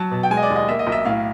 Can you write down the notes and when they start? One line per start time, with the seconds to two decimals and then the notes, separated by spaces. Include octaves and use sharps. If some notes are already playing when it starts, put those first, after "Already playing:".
Already playing: F#3 A5
0.11 B2
0.23 G5
0.30 G#3 G#5
0.37 D#5
0.42 D5
0.50 D#2
0.56 D#5
0.68 A#3 E5
0.79 D#5
0.87 B1
0.92 E5
1.05 A2 F5